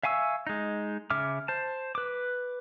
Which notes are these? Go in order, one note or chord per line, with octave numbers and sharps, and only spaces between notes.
E5 F5 G#5 C#6 E6
G#3 D#4
C#3 E5 D6 F6
C5 A5
B4 D6